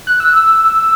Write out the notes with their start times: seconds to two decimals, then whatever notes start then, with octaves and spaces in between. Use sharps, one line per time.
0.07 F#6
0.20 E6